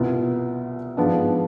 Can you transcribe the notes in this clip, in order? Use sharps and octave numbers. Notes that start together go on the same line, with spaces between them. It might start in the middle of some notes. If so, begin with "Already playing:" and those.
Already playing: C2 B2 B3 F4
G#2 F3 B3 D4